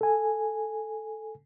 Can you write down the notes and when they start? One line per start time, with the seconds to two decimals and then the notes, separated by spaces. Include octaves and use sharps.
0.01 A4 G#5